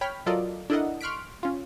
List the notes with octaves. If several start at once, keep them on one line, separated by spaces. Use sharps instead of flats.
C#5 G5 B5 F6 B6
F#3 F4 A4 A#4 D5 D#5
D4 E4 A4 A#4 D#5 F#5
C6 C#6 F6 F#6 B6 D7
C#4 F4